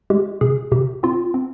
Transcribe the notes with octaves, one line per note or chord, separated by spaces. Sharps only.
G#3 G4
C3 G#4
C3 G4
C4 F4
C4